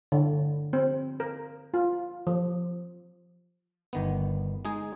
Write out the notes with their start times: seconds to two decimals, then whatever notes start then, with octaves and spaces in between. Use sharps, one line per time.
0.12 D3
0.73 C4
1.20 A#4
1.74 F4
2.27 F3
3.93 G1 D#3 B3
4.65 G#3 D#4 G#4